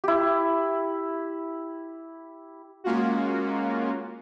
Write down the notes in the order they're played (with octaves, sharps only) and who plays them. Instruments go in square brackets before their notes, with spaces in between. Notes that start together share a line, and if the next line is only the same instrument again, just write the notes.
[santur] E4 G4
[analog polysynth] G#3 A#3 C#4 F4 F#4